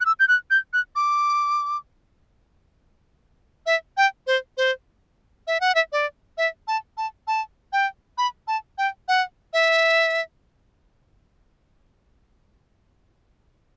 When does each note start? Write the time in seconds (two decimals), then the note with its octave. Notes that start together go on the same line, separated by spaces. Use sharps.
0.01 F#6
0.06 E6
0.20 G6
0.28 F#6
0.51 G6
0.73 F#6
0.96 D6
3.66 E5
3.97 G5
4.27 C5
4.57 C5
5.47 E5
5.60 F#5
5.75 E5
5.92 D5
6.38 E5
6.68 A5
6.97 A5
7.27 A5
7.73 G5
8.18 B5
8.48 A5
8.78 G5
9.08 F#5
9.53 E5